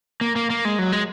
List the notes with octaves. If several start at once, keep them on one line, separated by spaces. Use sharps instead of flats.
A#3
A#3
A#3
G#3
F#3
G#3